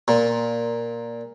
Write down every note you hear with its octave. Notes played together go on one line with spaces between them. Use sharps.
A#2